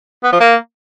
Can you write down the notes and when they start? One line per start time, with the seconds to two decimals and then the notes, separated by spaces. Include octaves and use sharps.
0.24 B3
0.32 F3
0.41 A#3